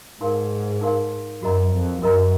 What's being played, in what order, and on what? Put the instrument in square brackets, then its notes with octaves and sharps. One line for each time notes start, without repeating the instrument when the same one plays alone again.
[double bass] G#2 [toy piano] D#4 A#4 F5 C6
[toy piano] D#4 A#4 F5 C6
[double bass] F#2 [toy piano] F#4 A#4 D#5 A#5
[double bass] F2
[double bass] F#2 [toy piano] F#4 A#4 D#5 A#5